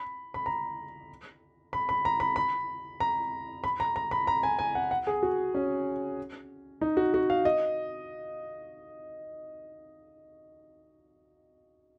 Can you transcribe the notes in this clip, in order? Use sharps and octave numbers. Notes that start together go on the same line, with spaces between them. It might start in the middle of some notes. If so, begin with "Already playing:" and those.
Already playing: B5
B5
A#5
B5
B5
A#5
B5
B5
A#5
B5
A#5
A#5
B5
A#5
G#5
G#5
F#5
F#5
G#4
F#4
C#4
D#4
F#4
F#4
F5
D#5